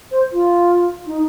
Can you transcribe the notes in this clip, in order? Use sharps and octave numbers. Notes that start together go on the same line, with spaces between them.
C5
F4
D#4